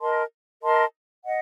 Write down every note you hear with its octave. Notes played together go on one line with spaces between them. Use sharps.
A#4 D#5 A5 C6
A#4 D#5 A5 C6
D#5 F#5